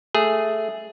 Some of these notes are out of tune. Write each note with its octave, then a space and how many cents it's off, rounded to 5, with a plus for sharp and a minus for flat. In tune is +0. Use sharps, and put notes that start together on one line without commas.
A3 +0 G#4 +0